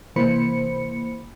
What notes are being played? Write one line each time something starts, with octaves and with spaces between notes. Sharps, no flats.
C3 E3 A#3 C5 B5 C#7